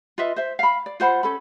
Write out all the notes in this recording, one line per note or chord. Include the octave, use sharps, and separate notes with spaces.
F4 B4 D#5 E5
C5 E5
F5 B5
D5
F4 C5 F#5 B5
C#4 A4 B5